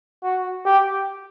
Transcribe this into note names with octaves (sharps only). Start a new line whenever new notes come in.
F#4
G4